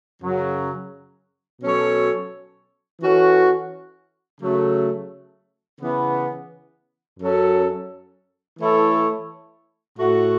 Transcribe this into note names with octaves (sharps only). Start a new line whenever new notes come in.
F#2 C#3 F#3
B2 F#3 C#4 A4 C#5
E3 C#4 F#4 A4
C#3 F#3 A3
C#3 E3 B3
F#2 F#3 C#4 A4
E3 A3 E4 A4 C#5
A2 A3 F#4